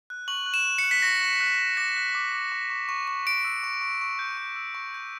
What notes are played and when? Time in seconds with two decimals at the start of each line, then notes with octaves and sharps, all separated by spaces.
0.10 F#6
0.28 C#6 F#7
0.46 F#6
0.54 E7
0.65 C#6
0.78 C#7
0.84 F#6
0.91 B6
1.02 C#6 A#6
1.21 C#6
1.41 F#6
1.59 F#6
1.77 D6 A#6
1.96 F#6
2.15 D6
2.33 D6
2.52 C#6
2.70 C#6
2.89 C#6
3.08 C#6
3.26 C#6 D7
3.45 E6
3.63 C#6
3.81 C#6
4.01 C#6
4.19 G6
4.37 C#6
4.56 E6
4.74 C#6
4.94 G6